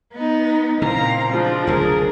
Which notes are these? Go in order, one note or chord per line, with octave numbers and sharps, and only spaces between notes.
B3 D#4
A#2 C#3 E3 C4 F5 A#5
F3 G#3 D4 F4
F#1 D2 C3 G#4 A#4